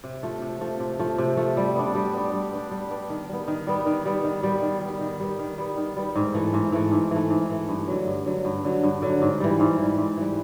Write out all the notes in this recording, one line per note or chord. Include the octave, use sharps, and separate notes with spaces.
C3
F3 A3
C3
F3 A3
C3
F3 A3
C3
F3 A3
G3
B3 D4
G3
B3 D4
G3
B3 D4
G3
B3 D4
D#3
G3 B3
D#3
G3 B3
D#3
G3 B3
D#3
G3 B3
D#3
G3 B3
D#3
G3 B3
D#3
G3 B3
D#3
G3 B3
G#2
E3 A3
G#2
E3 A3
G#2
E3 A3
G#2
E3 A3
G2
D3 F#3
G2
D3 F#3
G2
D3 F#3
G2
D3 F#3
G#2
E3 G3
G#2
E3 G3
G#2
E3 G3